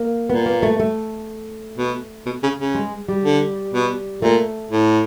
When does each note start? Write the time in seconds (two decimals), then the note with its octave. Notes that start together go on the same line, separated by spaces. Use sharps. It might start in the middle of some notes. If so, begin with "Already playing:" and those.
Already playing: A#3
0.30 A#2 B3
0.46 A#3
0.63 A3
0.80 A3
1.77 B2
2.26 B2
2.43 C#3
2.58 C#3
2.75 G#3
3.08 G3
3.24 D3
3.73 B2
4.22 A#2 A3
4.71 A2